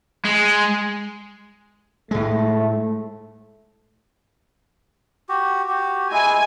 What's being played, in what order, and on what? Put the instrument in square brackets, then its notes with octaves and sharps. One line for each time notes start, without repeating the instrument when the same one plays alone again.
[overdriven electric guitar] G#3
[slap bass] A2 G#3 [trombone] A3
[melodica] F#4 G4
F#4 G4
[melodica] G#3 E4 [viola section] G#5